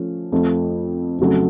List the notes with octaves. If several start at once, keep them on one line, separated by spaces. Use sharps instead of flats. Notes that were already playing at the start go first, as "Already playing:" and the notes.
Already playing: F3 A3 C#4
F2 F3 A3
F2 C#3 F#3 A3